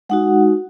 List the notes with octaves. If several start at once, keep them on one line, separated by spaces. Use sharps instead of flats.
G#3 D#4 F#4 F#5